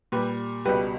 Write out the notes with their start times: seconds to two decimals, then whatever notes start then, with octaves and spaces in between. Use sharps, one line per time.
0.12 A#2 G3 G4 B4
0.65 C#2 B2 G3 G4 B4